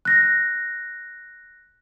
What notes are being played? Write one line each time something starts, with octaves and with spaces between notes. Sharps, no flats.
F#6 A#6